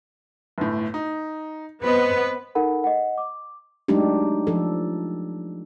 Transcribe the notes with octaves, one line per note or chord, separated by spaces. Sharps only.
G1 A2
D#4
B3 C4 B4 D#5
D#4 A4 A#4 F#5 B5
D#5 F#5
D6
F#3 G#3 A3 D4 D#4 G4
F3 A4